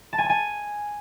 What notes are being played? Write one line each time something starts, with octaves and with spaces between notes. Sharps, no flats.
A5
G#5
A5
G#5